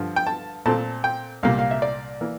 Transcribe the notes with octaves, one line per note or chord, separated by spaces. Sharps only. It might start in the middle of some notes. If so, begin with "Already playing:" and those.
Already playing: G2 D3 F3
G5
A5
A#2 A3 C4 A5
G5
C2 A#2 G3 A#3 F5
F5
E5
D5
E3 A#3